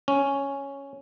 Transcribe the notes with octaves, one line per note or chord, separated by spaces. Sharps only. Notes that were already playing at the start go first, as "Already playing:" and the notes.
C#4